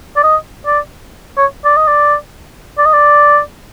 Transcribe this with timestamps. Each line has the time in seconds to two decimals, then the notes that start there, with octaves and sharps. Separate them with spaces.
0.17 D5
0.23 D#5
0.66 D5
1.37 C#5
1.65 D5
1.77 D#5
1.87 D5
2.78 D5
2.86 D#5
2.93 D5